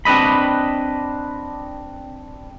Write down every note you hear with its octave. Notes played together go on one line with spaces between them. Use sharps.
C4 D4 B4 D#5 B5